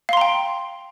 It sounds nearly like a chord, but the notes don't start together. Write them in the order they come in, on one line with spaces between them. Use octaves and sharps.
F5 C6 A#5 G5